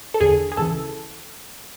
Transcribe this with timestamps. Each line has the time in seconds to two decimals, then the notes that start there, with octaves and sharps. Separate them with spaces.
0.14 A4
0.20 E2 D3 G#4
0.52 G#4
0.57 C#2 C#3 E3 A4